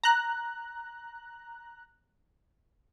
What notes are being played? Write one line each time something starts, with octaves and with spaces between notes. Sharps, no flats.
A#5 F#6